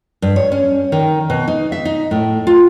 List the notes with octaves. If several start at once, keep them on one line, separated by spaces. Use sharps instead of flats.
G2
C#5
C#4
D#3
B2
D#4
E5
D#4
A2
F4